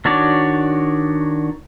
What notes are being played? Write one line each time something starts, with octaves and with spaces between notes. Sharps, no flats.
D#3 D4 F#4 C#5 D5